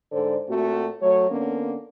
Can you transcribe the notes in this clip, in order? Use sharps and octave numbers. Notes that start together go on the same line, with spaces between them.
G#2 D3 A4 C5 D5
A#2 A3 C4 F#4
F#3 A3 F#4 C#5
D3 A#3 B3 C#4